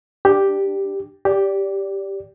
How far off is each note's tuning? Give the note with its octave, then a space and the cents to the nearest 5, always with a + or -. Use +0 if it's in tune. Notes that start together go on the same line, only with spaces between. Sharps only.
D4 +10 G4 +0
G4 +0 D5 -20